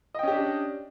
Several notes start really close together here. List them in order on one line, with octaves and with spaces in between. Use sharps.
D#5 G5 C#4 G4 D4